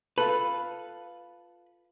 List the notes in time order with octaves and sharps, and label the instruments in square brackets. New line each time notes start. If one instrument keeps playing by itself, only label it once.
[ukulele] F4 A4 [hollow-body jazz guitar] B4